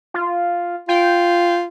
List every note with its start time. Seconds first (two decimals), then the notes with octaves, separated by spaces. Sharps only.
0.14 F4
0.89 F4 G5